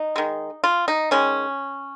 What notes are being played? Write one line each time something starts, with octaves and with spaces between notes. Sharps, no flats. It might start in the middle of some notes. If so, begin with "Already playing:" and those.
Already playing: D#4
D#3 G#3
F4
D#4
D#3 G#3 C#4